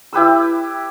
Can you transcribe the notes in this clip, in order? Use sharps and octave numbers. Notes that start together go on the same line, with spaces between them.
E4 G4 B4 E6